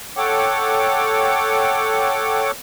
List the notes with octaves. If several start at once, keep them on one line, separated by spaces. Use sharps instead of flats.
A4 C#5 F#5 G5 D6